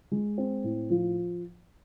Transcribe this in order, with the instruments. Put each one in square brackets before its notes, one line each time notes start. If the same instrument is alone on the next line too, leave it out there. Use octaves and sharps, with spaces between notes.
[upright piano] G#3
C4
A2
F3